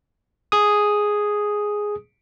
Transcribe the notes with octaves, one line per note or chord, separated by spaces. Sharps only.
G#4 D#6